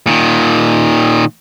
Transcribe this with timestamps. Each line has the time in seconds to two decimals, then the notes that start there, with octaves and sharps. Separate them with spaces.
0.07 A#2 D#3